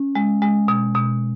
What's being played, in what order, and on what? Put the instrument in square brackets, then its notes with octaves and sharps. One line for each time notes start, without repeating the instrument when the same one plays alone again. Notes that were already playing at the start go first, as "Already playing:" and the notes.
Already playing: [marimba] C#4
G#3
G#3
B2
B2